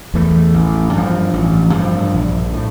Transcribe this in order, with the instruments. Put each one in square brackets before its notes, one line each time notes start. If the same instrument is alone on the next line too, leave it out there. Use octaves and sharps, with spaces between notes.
[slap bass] E2 E3 A3
A1
G2 F3
A1
G2 F3
A#1
A2